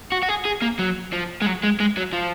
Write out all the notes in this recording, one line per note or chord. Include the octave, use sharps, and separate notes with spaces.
F#4
F#4
G#4
G#4
A#3
F#3
F3
G#3
F#3
G#3
G#3
F#3
F3